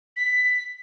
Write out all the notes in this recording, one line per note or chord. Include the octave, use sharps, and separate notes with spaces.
B6